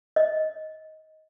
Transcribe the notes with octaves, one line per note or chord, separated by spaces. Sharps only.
D#5